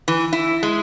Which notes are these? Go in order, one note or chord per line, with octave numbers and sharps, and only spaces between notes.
E3
E4
G#3